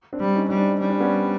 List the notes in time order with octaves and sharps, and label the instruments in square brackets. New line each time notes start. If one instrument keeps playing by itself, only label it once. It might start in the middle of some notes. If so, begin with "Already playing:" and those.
[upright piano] C4 D4
[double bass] G3
[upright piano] C#4 D#4
[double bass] G3
[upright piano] C4 D4
[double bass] G3 [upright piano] C#4
[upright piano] D4
B3 C#4